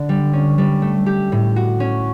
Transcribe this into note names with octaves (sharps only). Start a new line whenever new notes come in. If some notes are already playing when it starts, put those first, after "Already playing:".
Already playing: D3
G3
C#4
G3
A3
G4
A2
F#4
C#4